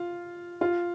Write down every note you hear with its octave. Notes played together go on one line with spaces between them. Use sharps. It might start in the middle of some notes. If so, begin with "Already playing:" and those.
Already playing: F4
F4